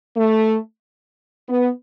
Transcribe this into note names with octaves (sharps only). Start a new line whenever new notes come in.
A3
B3